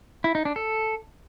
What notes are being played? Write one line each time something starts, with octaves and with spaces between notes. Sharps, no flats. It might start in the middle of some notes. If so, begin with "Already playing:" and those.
E4
D#4
D4
A4